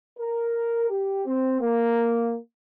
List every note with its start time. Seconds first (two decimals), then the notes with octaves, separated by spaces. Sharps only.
0.18 A#4
0.89 G4
1.25 C4
1.61 A#3